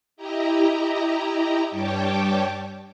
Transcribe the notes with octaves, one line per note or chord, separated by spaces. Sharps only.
E4 G4 D#5 A#5
G2 G3 C#5 G5 A5 D6